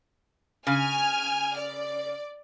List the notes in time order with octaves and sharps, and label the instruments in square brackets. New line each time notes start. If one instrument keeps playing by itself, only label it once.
[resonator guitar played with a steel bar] C#3 [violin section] G#5 F6
[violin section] D5